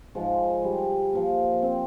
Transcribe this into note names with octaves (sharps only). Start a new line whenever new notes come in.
G#2 F3 G#3
G3
A#2 F3
C4